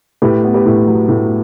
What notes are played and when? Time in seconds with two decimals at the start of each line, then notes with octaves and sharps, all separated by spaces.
0.22 A2 G4 B4
0.44 B3
0.54 G4 B4
0.66 A2
0.87 F#3
1.08 A2